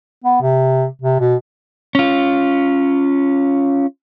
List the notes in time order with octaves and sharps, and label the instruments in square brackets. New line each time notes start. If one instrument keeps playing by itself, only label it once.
[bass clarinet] B3
C3
C3
B2
[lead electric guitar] C#4 F4